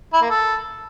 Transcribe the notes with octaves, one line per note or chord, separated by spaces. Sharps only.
E4
A#3
A4